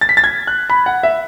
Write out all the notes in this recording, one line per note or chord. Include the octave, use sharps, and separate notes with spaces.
A6
B6
A6
G#6
F#6
B5
F#5
E5